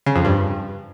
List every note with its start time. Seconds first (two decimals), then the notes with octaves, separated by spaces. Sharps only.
0.06 C#3
0.16 F2
0.25 G2